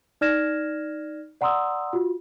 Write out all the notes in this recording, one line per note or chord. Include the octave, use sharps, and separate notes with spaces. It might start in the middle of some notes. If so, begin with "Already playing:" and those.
D#4 D5 F6 G#6 A#6 E7
D5 F#5 A#5 C6 D#6 E6
F4 F#4